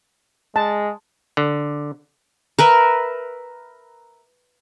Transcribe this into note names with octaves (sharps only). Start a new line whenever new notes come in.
G#3 A5
D3
A#4 B4 E5